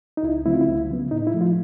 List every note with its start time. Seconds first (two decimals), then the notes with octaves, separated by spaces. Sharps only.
0.17 D#4
0.23 C#2 E4
0.46 C#3 F#3 A3 C4 E4
0.54 F4
0.61 E4
0.68 C#2
0.89 C#3 F#3 B3
1.11 A2 D#4
1.27 E4
1.34 F3 A3
1.41 F4